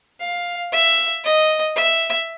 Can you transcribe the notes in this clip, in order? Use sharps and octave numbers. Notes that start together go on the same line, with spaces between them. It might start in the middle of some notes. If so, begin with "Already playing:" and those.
F5
E5
D#5
E5